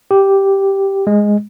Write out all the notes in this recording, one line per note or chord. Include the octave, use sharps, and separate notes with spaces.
G4
G#3